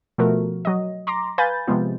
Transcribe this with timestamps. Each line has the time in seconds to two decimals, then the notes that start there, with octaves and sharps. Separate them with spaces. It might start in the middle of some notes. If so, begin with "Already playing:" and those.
0.18 B2 F3 A3 F#4 A#4
0.65 F#3 D#5
1.07 A#5 C6 D6 A#6
1.38 B4 F5 G#5 B5 G6 A6
1.67 C3 F3 G#3 B3 F4